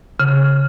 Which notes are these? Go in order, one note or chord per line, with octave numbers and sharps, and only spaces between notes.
C#3